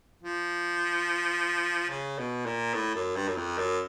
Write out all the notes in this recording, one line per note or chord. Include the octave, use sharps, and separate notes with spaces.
F3
C#3
B2
A#2
A2
F#2
G2
F#2
F2
F#2